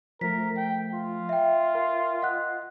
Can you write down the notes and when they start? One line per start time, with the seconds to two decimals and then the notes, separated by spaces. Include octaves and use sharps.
0.21 F3 A3 A#4 B6
0.57 G5
0.94 F4
1.29 E5 G5
1.75 A#4
2.22 D#5 F#5 F#6